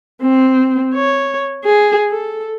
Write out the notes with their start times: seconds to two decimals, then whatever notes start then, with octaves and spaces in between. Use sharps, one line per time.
0.21 C4
0.94 C#5
1.65 G#4
2.11 A4